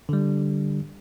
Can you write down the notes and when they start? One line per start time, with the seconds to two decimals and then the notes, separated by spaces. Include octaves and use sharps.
0.09 D3 G3